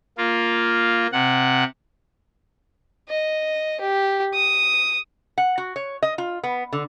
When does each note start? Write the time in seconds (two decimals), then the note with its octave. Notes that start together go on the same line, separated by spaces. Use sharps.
0.18 A#3 F4
1.12 C3 F#5
3.09 D#5
3.80 G4
4.34 D#6
5.38 F#5
5.58 F#4
5.76 C#5
6.02 D#5
6.18 F4
6.44 B3
6.73 D3